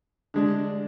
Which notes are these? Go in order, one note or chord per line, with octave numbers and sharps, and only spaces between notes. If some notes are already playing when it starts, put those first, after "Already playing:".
D3 G#3 D4